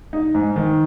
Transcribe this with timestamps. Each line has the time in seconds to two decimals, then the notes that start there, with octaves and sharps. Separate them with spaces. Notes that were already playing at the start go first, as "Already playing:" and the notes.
0.13 D#4
0.35 G#2
0.56 D#3